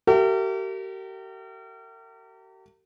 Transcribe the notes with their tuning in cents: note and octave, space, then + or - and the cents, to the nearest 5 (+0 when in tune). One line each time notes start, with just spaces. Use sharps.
G4 -40 A#4 -40 E5 +30